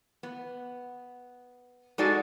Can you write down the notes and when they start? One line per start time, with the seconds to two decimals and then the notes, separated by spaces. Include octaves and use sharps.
0.23 B3
1.98 G#3 D#4 F#4 G#4 A4 D5